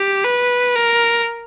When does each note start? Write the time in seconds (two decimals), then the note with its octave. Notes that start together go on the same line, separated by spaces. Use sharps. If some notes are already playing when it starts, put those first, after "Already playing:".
Already playing: G4
0.24 B4
0.76 A#4